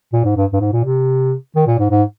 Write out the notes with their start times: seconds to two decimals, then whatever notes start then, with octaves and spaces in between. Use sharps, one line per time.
0.13 A#2
0.24 G#2
0.37 G2
0.53 G2
0.60 G#2
0.72 A#2
0.84 C3
1.55 D#3
1.67 A#2
1.79 G#2
1.90 G#2